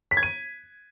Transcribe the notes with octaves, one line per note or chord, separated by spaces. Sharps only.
B6
G#6
D#7